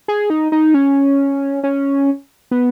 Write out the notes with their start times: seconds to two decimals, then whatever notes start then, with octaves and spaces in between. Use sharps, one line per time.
0.08 G#4
0.30 D#4
0.52 D#4
0.74 C#4
1.63 C#4
2.51 B3